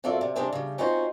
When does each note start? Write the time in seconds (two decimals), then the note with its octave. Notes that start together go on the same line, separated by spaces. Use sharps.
0.04 F#2 C4 F4 A4 D5 E5
0.21 C3
0.36 C3 D#3 G3 D4 G#4 C5
0.53 C#3 G3
0.78 C4 C#4 D#4 F4 F#4 C5